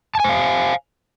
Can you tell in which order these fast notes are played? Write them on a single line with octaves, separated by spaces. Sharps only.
A5 G#5 C5 F5